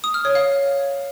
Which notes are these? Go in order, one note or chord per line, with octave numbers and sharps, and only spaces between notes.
D#6
F6
C#5
F5